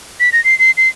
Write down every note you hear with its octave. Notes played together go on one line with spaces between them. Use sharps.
B6
A#6
C7
C7
C7